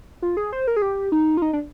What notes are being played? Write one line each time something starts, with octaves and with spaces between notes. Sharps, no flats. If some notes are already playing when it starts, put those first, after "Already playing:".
F4
G#4
C5
A#4
G#4
G4
D#4
F4
D#4
D4